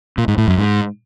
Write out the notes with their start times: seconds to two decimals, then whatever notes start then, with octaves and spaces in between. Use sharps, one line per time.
0.18 A#2
0.28 G#2
0.38 A2
0.48 F#2
0.58 G#2